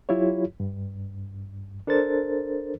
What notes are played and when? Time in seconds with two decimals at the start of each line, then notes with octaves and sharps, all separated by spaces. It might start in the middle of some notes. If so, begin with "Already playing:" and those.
0.09 F#3 E4 F4 G4 C#5
0.60 G2
1.87 D4 A4 A#4 C5 A6